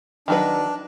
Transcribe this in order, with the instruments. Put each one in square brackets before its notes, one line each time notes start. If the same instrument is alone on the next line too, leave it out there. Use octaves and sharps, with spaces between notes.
[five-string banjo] D#3 F#3 B4 [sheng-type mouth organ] D4